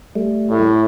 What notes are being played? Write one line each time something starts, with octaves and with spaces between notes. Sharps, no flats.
G3 A3
A2